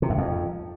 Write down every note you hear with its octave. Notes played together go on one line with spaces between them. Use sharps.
C3
F#2
F2